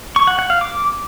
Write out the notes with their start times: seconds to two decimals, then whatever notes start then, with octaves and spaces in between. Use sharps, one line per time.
0.16 C#6
0.27 F#5
0.39 F#5
0.50 F5
0.61 D6